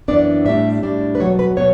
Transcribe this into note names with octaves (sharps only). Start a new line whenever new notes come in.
F#2 E3 B3 D4 D5
A2 G3 D4 E5
A2 G3 D4
B4
E2 B2 F#3 B3 C#5
B4
B2 F#3 B3 C#5